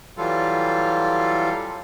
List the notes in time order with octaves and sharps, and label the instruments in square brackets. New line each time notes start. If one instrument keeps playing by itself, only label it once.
[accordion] E3 F#3 G3 F4 A4